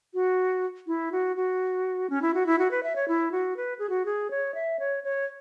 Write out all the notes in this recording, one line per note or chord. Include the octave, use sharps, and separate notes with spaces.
F#4
E4
F#4
F#4
C#4
E4
F#4
E4
F#4
B4
E5
C#5
E4
F#4
B4
G#4
F#4
G#4
C#5
E5
C#5
C#5